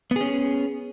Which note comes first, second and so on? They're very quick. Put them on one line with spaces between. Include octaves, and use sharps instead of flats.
B3 G#4 C#4